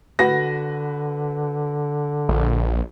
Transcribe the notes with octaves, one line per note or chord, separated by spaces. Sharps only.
D3 F#4 B4 A#6
A#1